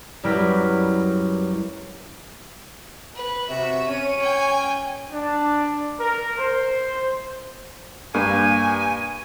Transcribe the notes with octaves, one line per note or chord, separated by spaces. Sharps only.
F#2 G3 E4 G4 A#4 B4
B4
C3 F#4 E5
C#4 C#5 D#7
G5 G#5
D4
A#4
C5
G2 A#3 G#5